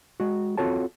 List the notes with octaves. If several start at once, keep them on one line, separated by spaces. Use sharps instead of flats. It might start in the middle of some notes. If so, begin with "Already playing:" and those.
G#3 F#4
C4 F4 F#4 A4 C#5 A5